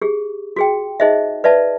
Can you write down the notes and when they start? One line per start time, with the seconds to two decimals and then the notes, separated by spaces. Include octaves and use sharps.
0.02 G4 G#4
0.56 F#4 G#4 G5
1.00 D#4 G#4 C5 D#5 E5
1.44 B4 D5 E5 A5